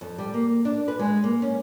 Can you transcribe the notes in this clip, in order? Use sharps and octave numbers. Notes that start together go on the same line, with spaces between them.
F2
G3
A#3
D4
B4
G#3
A#3
C#4